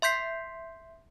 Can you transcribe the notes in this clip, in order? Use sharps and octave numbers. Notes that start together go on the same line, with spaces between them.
E5 C6 G6 B6 C7